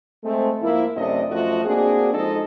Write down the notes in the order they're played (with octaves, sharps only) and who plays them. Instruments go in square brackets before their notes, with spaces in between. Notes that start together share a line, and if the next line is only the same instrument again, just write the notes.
[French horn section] G#3 A3 C4
G#2 F3 A#3 E4
F#2 C3 A3 D4 D#5
F#2 F3 A3 F4 F#4 D#5
A#3 C4 D4 F#4 G#4
F3 G#3 D#4 G#4 A4 D#5